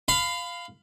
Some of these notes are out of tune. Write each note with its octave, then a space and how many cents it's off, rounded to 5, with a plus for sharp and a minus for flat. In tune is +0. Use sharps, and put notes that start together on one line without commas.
F5 +0 B5 +30